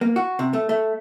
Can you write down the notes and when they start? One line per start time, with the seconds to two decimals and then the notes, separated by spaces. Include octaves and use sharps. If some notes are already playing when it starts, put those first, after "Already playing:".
0.01 A#3
0.16 F#4
0.39 C3
0.53 A3
0.69 A3